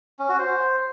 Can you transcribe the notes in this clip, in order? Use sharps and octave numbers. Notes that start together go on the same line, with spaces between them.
C#4
F#4
C5